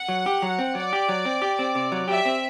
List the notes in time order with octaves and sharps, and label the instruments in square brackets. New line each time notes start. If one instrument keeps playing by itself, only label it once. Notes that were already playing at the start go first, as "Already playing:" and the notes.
Already playing: [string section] F#5
[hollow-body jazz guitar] F#3
G4
F#3
C4
[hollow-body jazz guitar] F#3 [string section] D5
[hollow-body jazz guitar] G4
F#3
C4
G4
C4
C3
F#3
[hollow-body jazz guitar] G4 [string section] E5
[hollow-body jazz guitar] C4